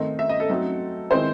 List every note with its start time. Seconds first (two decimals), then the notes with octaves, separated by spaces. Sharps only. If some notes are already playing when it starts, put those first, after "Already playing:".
Already playing: D#3 A3 C4 D#4
0.19 E5
0.29 D#5
0.40 A4
0.50 F#3 A3 C4 D#4
1.11 D#3 G#3 C4 E4 C5